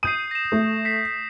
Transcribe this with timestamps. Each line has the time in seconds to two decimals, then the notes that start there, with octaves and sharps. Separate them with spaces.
0.03 D#6 G6 C7 D#7
0.31 A#6 E7
0.52 A3
0.85 B6 C7